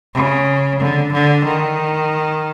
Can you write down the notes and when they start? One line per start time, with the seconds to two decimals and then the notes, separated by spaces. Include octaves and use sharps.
0.14 C#3
0.80 D3
1.12 D3
1.45 D#3